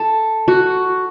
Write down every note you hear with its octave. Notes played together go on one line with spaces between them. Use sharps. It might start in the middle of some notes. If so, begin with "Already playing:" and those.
Already playing: A4
F#4